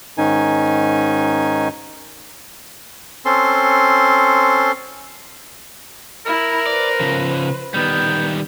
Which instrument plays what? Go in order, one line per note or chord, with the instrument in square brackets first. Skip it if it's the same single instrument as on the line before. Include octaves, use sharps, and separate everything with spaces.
[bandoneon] G#2 D#3 C#4 D#4 G#5
[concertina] C4 C#4 A4 C6
[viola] E4 [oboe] A#4
[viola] B4 C5 [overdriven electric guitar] D5
[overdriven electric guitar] C#3 F3
[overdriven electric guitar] D#3 G3 [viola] B3 [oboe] G5